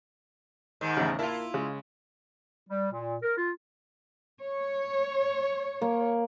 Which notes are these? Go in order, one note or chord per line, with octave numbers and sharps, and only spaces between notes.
G#2 D#3
E2 A2 C#3
A#3 E4 F4 A5
C#3 G#3
G3
A#2
A#4
F4
C#5
A#3